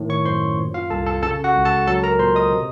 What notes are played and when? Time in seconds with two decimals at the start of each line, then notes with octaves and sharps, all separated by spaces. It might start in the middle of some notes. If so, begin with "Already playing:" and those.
Already playing: A2 D#3
0.10 C#5 C#6
0.25 F#2 C5 C6
0.58 A#2
0.74 F4 F5
0.90 C2 A4 A5
1.06 A4 A5
1.23 C#3 A4 A5
1.44 F#4 F#5
1.55 C#2
1.65 A4 A5
1.87 F#3 A4 A5
2.03 A#4 A#5
2.19 A#2 C5 C6
2.35 D#5 D#6
2.52 C3